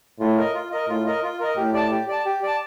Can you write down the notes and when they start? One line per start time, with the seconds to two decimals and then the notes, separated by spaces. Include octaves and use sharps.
0.20 A2 F4
0.38 A#4 D#5
0.55 F4
0.72 A#4 D#5
0.89 A2 F4
1.06 A#4 D#5
1.23 F4
1.40 A#4 D#5
1.57 A2 G4
1.74 D5 A5
1.91 G4
2.08 D5 A5
2.25 G4
2.43 D5 A5